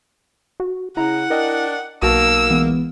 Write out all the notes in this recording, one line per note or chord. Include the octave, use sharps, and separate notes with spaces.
F#4
C#3 E4 F#5 A#5
D4 A#4 D#5 G5
B1 A#3 F#4 A5 E6
E3 G#3 B3